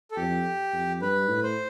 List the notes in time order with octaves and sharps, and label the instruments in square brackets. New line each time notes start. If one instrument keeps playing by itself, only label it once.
[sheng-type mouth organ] A4
[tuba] F2 [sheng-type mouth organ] G4
[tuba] F2
[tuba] G2 [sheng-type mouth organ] B4
[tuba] A2
[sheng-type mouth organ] C5